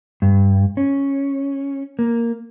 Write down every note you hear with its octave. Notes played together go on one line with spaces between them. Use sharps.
G2
C#4
A#3